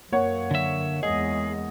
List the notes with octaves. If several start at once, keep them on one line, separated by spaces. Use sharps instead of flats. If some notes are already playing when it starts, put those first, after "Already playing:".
F#2 F#3 A#3 C#5 F#5
D3 E5
E2 G#3 G#4 D#5